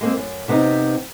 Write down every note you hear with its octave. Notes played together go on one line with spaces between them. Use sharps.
G#3 A#3 C4
F#2
C3 B3 C4 D#4